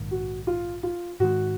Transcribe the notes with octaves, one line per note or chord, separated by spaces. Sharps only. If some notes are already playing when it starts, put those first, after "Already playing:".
Already playing: A#1 G#2 D#3
F#4
F4
F4
G#2 D#3 G#3 F#4